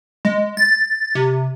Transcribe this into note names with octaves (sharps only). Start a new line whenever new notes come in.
G#3
A6
C3